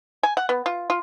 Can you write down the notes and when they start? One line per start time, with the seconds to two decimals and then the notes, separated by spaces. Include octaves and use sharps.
0.23 G#5
0.37 F#5
0.49 B3
0.66 F4
0.90 F4